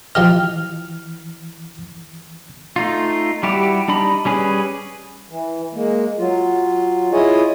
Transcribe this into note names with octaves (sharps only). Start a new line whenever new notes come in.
E3 F3 G4 D#5 F6
A3 D#4 F4
G3 E4 F#4 G4
G3 D4 D#4 B5
G3 C#4 G#4 B4
E3
G#3 A#3
F#3 F4
E4 F4 G#4 C#5 D#5